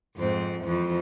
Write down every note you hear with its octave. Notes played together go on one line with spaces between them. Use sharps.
F2 G#2 C4
F2 E3 F3